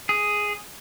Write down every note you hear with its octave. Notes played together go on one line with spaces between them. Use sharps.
G#4